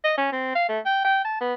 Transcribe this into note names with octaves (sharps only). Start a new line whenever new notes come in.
D#5
C#4
C4
F5
A3
G5
G5
A5
B3